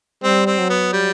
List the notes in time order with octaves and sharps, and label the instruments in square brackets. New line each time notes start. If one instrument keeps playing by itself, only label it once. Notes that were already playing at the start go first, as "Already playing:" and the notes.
[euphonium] G3 [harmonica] C4
[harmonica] C4
[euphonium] F#3
[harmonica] B3
G3